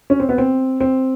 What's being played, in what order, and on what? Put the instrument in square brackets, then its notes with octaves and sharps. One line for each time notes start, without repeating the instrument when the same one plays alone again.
[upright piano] C#4
C4
B3
C4
C4